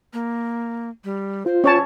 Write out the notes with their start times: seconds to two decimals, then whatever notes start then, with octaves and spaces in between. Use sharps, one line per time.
0.13 A#3
1.04 G3
1.46 F4 C5
1.64 C#4 C#5 A5